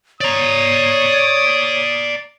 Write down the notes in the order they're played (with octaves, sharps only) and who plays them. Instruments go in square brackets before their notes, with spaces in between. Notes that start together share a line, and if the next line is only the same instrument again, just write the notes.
[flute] C#5 [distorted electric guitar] D5 A#5 [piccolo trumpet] D#6